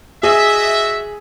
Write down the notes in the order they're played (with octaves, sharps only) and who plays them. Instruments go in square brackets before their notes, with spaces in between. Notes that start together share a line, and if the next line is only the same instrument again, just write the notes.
[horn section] F#4 D#5 E5 [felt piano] G#4